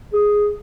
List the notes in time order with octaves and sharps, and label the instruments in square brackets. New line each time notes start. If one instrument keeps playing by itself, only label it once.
[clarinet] G#4